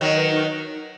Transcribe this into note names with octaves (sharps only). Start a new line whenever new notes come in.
D#3 F#3 C#5
B4
D#4